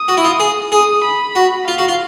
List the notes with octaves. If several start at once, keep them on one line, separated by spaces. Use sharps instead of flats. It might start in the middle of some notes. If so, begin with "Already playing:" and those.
Already playing: D#6
F#4
E4
F4
G#4
G#4 D#6
B5
F#4
F4 F5
F#4
F4